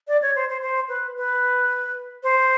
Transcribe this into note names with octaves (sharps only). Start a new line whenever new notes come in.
D5
C#5
C5
C5
C5
B4
B4
C5